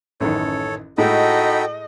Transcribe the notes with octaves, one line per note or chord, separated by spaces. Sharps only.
A1 F#2 D#3 A4 C#5
A2 G#3 D#4 F#4 A4 D#5 G5 B5